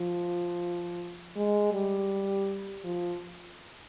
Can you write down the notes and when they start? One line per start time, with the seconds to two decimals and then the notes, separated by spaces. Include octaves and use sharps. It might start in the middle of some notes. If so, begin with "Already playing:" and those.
Already playing: F3
1.36 G#3
1.73 G3
2.84 F3